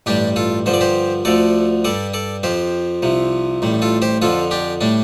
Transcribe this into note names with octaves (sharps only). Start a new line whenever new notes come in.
A1 G2 G3 D4 G4
F4 A4
G2 D3 F3 C5
D5
G4 C5
D2 D3 F3 A4 D5
G2 G3 A4 D5
A4 D5
F2 F3 G4 C5
C2 C3 F3
A1 A2 G3
F4 A4
G4 C5
F2 D3 F3 F4 A4
D4 G4
A2 G3 D4